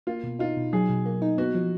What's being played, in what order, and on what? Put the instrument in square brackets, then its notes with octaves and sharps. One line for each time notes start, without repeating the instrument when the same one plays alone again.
[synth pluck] A#3 [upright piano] F4
[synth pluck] B2
[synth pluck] D#4 [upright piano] F4
[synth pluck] B2
[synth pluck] F#3 [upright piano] G#4
[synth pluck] B2
A#3
D#4
[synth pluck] B3 [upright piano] F#4
[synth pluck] F3